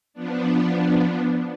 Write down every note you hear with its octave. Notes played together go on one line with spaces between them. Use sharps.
F3 B3 D4